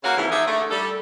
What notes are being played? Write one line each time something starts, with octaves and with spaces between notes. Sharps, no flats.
C#3 A#3 C#4 F#4 A#4 F5
F2 G#2 C#3 E3
D3 D#4 G4 G#4 E5
D3 A3
G3 A4